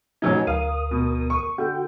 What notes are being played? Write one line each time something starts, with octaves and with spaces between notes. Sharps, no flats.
A1 F#3 D#4 G#5
D2 A#4 F5 D#6
B2
C#6
D3 F#4 G5